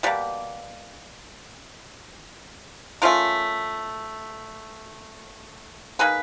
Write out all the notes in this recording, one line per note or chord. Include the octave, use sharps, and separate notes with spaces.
B2 G3 A#3
A3 C#4 F4 A#4
A#3 D#4 G#4 B4